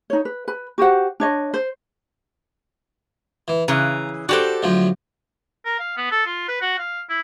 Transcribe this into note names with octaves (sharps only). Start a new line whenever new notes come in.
D#4 C#5
B4
B4 B5
F#4 G4 C5 F#5
D4 C#5 D#5
C5
E3
C#3 E3 A#5
F#4 G4 A4 C5 D5
D2 F3 F#3
A#4
F5
B3
A4
F4
B4
F#4
F5
E4